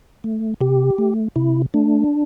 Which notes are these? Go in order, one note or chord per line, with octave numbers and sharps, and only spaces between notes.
A3
C3 G4
A3
C3 E4
A3 D4